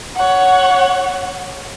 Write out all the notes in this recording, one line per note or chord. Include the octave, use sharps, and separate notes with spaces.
C#5 F#5